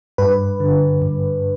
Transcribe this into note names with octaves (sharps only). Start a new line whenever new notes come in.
G2 B4
D3
G2